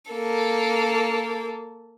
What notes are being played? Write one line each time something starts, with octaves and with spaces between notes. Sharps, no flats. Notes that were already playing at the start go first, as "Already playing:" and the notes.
A#3 A4